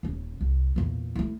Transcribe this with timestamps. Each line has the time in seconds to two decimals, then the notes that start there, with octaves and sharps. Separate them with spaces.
0.03 D#1 C#4
0.41 C2
0.76 E2 A#2
1.15 A3 E4